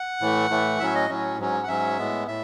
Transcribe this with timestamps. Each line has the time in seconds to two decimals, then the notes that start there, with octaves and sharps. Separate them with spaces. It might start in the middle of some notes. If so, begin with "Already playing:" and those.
Already playing: F#5
0.21 A2 E3 A3
0.50 A2 E3 A3
0.79 A2 F#3 C#4 E5
0.95 D#5
1.09 A2 F#3 C#4
1.39 G#2 F#3 C#4
1.63 F#5
1.68 G#2 F#3 C#4 E5
1.98 A2 G#3 B3
2.28 A2 E5